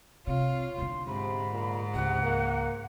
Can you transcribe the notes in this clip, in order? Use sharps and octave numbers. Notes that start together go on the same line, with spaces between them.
C3 F4 C#5 F5
E2 D3 C6
G#2 C3 B5
A#2
C#2 C3 F#5
A#3